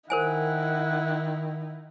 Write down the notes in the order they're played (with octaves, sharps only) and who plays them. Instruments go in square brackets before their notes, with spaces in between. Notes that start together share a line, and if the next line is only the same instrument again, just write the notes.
[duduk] D#3 [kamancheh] D#4 E4 [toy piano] A#4 C5 G#5 [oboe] F#5